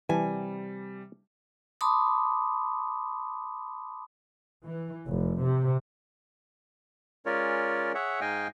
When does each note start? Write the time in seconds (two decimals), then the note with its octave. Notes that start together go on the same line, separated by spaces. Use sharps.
0.09 C3 E3 G3 G#5
1.81 A5 B5 C6 D6 D#6
4.65 E3
5.07 F1
5.41 C3
7.26 G#3 C#4 F4 A#4 C#5 D5
7.94 G#4 C#5 E5 F#5
8.21 G#2 G#3 D#5 F5 G5 G#5